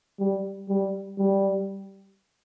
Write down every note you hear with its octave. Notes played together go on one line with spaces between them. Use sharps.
G3
G3
G3